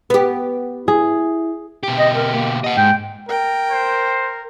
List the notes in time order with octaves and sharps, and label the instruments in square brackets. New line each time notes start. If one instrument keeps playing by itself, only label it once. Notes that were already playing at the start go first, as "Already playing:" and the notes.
[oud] B3 G4
[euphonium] E4 [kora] G#4
[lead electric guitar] B2 G4
[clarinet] D#5
A#4
A#3
[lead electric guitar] D#5 F#5
[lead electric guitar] G#2 [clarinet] G5
[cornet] A#4 [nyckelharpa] G5
[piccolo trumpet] C5